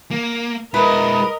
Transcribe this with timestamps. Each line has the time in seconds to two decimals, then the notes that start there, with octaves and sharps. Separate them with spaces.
0.11 A#3
0.74 G#3 E4 A#4 B4 D#5